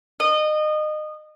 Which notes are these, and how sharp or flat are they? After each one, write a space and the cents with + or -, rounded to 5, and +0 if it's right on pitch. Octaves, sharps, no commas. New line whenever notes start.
D#5 -25